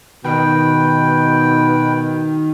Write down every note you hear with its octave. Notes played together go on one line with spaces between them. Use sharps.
B2 D#3 B4 G5